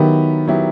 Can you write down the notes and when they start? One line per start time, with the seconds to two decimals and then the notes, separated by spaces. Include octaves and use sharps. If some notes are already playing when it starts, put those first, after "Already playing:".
Already playing: D#3 F#3 B3 E4 G4
0.48 F#3 B3 E4 G4